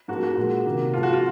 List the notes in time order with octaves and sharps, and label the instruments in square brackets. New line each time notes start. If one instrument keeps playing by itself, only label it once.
[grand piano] G#2 F3 A#3 F#4
F#4
A#2 G#3
C3 D#3 A#3
G#2 F3 G#3 F4
F#4
F4